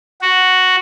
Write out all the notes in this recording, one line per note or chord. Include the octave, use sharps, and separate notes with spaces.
F#4